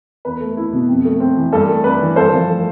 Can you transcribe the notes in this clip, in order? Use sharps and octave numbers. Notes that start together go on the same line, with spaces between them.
E2 B4
A3
E4
B2
F2
A3
C4
E3
G2 A4
A3
D4 B4
E3
G2 A4 C5
F3
A3